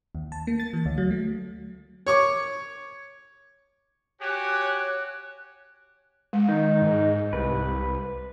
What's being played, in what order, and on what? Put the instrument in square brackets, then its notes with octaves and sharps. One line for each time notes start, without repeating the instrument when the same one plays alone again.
[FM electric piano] D#2
A5
A#3
A6
E3
D2
F#3
A3
[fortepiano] C#5 C#6 D6
[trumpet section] F#4 G4 G#5 [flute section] C#5 F#6
[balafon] G#3
[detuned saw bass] D#3 [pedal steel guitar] D#4
[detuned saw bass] G#2
[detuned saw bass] C2 [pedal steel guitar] B4